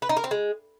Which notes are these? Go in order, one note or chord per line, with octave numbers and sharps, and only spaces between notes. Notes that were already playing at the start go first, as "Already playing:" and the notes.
B4
D#4
A#4
C4
G#3